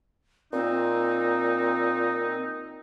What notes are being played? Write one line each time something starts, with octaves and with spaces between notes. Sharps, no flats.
A#2 C4 D#4